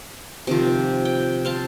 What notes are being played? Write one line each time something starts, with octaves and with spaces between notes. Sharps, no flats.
C3 D#3 F3
G5
C5 F5 A5